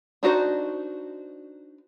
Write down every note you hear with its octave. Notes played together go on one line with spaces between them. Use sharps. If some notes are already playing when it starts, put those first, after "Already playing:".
D4 D#4 F#4 C5